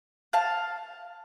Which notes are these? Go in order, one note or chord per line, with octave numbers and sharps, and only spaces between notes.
F5 A5